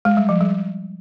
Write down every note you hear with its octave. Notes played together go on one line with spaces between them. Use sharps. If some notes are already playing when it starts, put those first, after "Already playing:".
G#3
G3
F3
G3